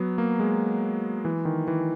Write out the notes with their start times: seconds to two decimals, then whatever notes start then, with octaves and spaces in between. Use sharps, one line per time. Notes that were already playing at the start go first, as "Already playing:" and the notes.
Already playing: F#3 B3
0.18 A#3
0.40 G#3
1.25 E3
1.45 D#3
1.68 E3